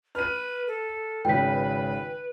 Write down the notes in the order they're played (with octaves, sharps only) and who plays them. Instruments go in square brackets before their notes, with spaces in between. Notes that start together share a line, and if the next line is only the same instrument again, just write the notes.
[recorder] B4 [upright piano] F6 D#7
[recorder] A4
[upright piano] G#1 C#3 [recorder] B4 [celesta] G5 B6